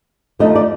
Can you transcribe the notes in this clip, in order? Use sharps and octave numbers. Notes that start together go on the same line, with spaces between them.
D#2 D3 F3 A3 D#4 D#5
D5